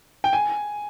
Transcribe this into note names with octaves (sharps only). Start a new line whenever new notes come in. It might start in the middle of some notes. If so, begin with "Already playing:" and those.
G5
G#5